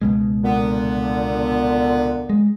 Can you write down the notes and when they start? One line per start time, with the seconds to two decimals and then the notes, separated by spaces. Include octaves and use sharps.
0.01 C#2 B2 G#3
0.44 A#2 D3 B3
2.29 G#3